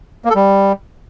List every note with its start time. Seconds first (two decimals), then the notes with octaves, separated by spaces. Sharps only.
0.25 A#3
0.30 A4
0.36 G3